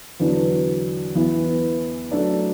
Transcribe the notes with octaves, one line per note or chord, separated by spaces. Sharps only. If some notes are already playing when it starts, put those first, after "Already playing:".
E2 D3 F#3 D4 B4
E2 E3 B3 E4
F#3 A3 D4 A4 D5